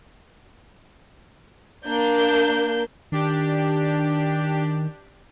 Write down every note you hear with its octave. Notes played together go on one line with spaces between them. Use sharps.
A#3 D4 G6
D#3 D4 G4